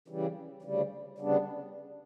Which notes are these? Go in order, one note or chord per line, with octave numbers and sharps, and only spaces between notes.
C#3 E3 G3
D2 C#3 G3
D2 C#3 G3 B3 D4